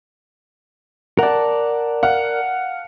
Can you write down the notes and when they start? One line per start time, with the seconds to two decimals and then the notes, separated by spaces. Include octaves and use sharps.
1.19 A#4 D5 F#5 A5
2.03 F5 F#5